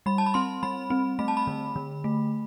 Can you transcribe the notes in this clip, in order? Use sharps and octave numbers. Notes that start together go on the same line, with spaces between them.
G3 B5
A5
B5
C4 C6
G3 B5
C4
A3 B5
A5
B5
D3
D3
A3